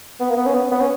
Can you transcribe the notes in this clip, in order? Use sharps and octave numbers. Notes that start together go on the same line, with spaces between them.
B3
A#3
B3
C#4
B3
B3
C#4